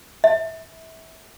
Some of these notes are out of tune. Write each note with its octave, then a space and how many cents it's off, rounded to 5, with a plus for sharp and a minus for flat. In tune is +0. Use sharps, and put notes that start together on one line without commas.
E5 -25